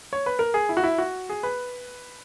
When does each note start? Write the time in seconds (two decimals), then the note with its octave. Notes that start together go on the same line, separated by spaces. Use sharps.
0.13 C#5
0.26 B4
0.39 A#4
0.54 G#4
0.69 E4
0.77 F#4
0.84 E4
0.98 F#4
1.29 G#4
1.43 B4